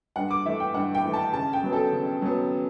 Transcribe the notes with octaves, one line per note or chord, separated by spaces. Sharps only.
G2 F#5
D6
E3 A3 E5
G5
G2 F#5
G5
E3 A3
A5
C#3 A5
G5
F#3 B3
A4
C#3
F#3 B3